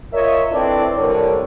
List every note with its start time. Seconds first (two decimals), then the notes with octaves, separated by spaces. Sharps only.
0.13 F4 A#4 C#5 D#5 E5
0.52 C4 D4 E4 A4 B4 D5
0.97 C2 A2 D3 A#4 C#5